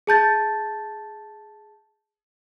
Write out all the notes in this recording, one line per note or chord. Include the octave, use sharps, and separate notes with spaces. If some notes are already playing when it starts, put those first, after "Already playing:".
G#4 A5 G6 A6